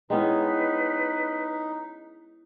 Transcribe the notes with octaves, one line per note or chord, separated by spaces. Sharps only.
G#3 B3 C#4 D#4 E4 B4 G5